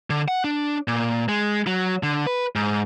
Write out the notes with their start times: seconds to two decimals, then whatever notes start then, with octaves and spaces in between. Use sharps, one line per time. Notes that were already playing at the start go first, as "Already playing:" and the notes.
0.10 D3
0.28 F#5
0.44 D4
0.88 A#2
1.29 G#3
1.67 F#3
2.03 D3
2.27 B4
2.55 G#2